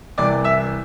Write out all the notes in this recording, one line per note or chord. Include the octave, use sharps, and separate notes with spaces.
C2 C3 E3 D5 D6
E5 E6